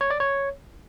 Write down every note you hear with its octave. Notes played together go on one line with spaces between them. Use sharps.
C#5
D5
C#5